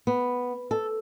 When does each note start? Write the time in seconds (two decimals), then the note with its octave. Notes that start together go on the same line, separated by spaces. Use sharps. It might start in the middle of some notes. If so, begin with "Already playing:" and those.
0.07 B3
0.71 A4